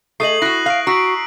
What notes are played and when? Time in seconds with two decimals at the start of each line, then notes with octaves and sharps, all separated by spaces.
0.20 A3 G#4 D#5 C#6 D#6 C7 D#7 F#7
0.42 E4 F#4 F#6 A#6
0.66 F5 C7 D7
0.87 F#4 A#5 E6 B6 D7